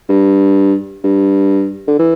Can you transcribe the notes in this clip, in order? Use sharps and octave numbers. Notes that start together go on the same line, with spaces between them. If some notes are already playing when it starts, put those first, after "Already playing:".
G2
G2
D3
E3